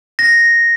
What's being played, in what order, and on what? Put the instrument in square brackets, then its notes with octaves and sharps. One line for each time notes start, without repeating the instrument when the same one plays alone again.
[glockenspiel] A#6